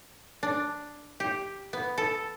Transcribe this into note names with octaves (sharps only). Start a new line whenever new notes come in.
D4
G4
B3
A4